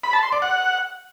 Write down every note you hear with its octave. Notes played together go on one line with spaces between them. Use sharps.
B5
A5
C6
D5
F#5